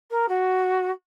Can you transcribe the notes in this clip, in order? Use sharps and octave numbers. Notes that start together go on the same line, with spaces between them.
A#4
F#4